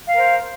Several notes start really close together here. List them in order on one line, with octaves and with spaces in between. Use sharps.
F5 A#4 C5